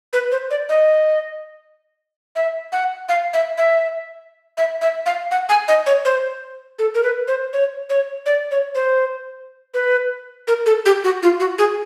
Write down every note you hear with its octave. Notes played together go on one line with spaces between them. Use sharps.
B4
C5
D5
D#5
E5
F#5
F5
E5
E5
E5
E5
F5
F#5
G#5
D#5
C#5
C5
A4
A#4
B4
C5
C#5
C#5
D5
C#5
C5
B4
A#4
A4
G4
F#4
F4
F#4
G#4